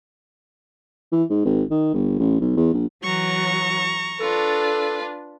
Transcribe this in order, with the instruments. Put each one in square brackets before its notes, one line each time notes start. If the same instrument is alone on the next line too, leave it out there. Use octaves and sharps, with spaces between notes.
[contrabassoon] E3
G#2
G#1
D#3
G1
A1
B1
E2
A#1
[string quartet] E3 F#3 [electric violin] A#5 C#6
[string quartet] D4 F4 B4 [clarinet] A4